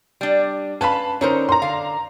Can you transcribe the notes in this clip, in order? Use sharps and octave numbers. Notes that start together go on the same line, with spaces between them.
G3 D4
C#4 B4 F5 A5 B5
D3 C#4 D#4 A#4 C5
A#5 C6
D3 F5